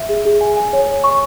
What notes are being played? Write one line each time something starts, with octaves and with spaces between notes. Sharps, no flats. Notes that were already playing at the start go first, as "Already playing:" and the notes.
Already playing: E5
G#4
G#4
G#5
G#5
C#5
C#5
C#6